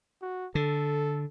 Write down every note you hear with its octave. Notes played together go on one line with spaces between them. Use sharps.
F#4
D3 A4